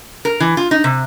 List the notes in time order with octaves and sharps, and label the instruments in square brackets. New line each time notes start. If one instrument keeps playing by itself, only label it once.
[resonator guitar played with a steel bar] A#4
E3
F4
D#4
C3